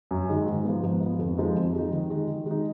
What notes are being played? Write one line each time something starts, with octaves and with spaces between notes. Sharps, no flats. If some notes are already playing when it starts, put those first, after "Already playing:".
F#2
D#3 G#3 D#4
G#2
F3 B3
G#2
F3
B3
F2
F3 G#3 D#4
F2
F3 G#3 D#4
D#3
G#3 D#4
D#3
G#3 D#4